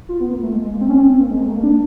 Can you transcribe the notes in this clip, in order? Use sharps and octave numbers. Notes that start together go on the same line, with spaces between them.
F4
B3
A#3
A3
G#3
G#3
A#3
C4
C#4
C4
C4
A#3
G#3
A#3
A3
A#3
D4